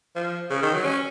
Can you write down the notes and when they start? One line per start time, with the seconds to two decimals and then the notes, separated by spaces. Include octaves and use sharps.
0.15 F3
0.50 C#3
0.62 D#3
0.74 F#3
0.85 C#4